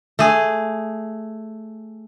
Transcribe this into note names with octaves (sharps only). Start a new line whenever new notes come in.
A3 G#4